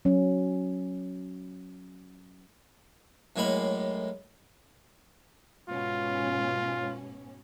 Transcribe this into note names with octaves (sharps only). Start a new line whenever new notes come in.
F#3 C#4
F#2 A2 G#3 A#3 B5
G#2 B2 C#4 F4